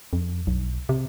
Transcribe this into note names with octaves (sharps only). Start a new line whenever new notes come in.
F2
B1
C3